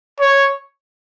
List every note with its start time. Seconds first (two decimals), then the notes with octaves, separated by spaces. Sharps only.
0.20 C#5